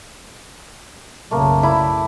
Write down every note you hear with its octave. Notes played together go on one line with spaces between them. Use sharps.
B1 F#2 C#3 A3 A#3
E4 B5 D6